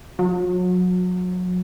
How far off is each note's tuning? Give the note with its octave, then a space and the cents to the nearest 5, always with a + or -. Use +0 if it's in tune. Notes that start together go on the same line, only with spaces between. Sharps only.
F#3 -30